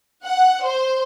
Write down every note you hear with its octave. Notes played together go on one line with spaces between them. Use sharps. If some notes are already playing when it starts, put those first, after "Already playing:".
F#5
C5